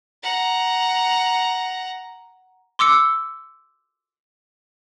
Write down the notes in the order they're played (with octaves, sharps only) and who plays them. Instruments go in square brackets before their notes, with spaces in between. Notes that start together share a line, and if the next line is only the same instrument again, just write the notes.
[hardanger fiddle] F#5 A#5
[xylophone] C6 D6 E6 C#7